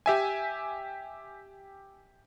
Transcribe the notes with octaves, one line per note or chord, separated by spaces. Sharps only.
G4 E5 G#5